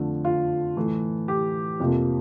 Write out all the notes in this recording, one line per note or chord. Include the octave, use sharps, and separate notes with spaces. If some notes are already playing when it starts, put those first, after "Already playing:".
Already playing: F2 D3 F3 A3
F4
A2 E3 A3
G4
F2 C3 F3 A#3